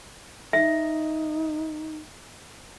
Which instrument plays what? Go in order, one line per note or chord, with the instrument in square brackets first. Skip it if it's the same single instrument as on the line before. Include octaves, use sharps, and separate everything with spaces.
[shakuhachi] D#4 [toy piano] E5